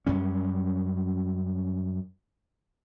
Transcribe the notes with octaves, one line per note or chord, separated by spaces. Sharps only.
F#2 G3 C#4